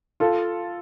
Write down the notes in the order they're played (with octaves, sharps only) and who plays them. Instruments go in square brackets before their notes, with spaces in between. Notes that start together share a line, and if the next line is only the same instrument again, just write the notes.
[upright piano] F4 A4